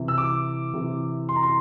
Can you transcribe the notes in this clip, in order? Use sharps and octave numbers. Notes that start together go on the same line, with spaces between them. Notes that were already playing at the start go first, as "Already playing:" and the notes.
Already playing: C3 E3
E6
D6
C3 E3
C6
A#5
C6